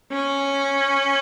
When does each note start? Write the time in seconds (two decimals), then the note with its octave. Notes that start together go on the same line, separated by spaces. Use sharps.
0.12 C#4